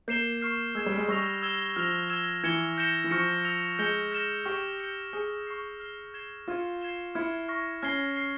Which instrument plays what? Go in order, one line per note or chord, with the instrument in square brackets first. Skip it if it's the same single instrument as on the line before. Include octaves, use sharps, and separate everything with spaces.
[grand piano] A#3 [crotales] G6 C7 E7 G7
[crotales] C#6 F6 C7
[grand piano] G#3 [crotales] E6 G#6 E7
[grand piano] G3
G#3
[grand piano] G3 [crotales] C#6 E6 A#6 F7
[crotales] E6 G#6 E7 G7
[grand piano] F3 [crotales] F6 A#6 F7
[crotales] E6 G#6 E7 G7
[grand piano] E3 [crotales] G#6 C#7 E7 G7
[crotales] G6 A#6 C#7 E7 G7
[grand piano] E3
[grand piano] F3 [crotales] C#6 F6 A#6 C#7
[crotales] E6 A#6 F7
[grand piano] G#3 [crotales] G6 A#6 C#7 E7 G7
[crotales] F6 A#6 E7 G7
[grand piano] G4 [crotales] C#6 F6 A#6 C#7
[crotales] G6 C#7 G7
[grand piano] G#4 [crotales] G6 C#7 G7
[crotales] C#6 F6 C7
F6 C7 G7
G#6 C7 E7 G7
[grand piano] F4 [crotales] F6 G#6 C#7
[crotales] G#6 C7 E7 G7
[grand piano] E4 [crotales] F6 G#6 C#7
[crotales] C#6 F6 A#6
[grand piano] C#4 [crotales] F6 G#6 C7 G7
[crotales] F6 C7 G7